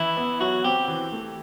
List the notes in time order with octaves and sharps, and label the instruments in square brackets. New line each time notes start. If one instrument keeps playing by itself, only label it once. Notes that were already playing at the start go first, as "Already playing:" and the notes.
Already playing: [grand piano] E3 [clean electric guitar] E4
[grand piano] B3
[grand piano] F#3 [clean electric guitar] F#4
[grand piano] C4 [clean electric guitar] G4
[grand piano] E3
A3